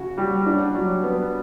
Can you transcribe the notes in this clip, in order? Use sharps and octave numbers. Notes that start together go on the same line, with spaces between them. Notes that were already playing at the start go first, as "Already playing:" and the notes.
Already playing: C#3 F#4
G3
D4
F#3
B3